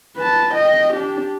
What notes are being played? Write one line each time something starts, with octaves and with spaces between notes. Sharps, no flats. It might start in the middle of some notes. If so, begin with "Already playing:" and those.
B4 A5
D#5 G5
D4 G4